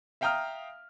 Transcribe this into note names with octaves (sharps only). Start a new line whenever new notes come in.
E5 F5 G5 A#5 D#6 F6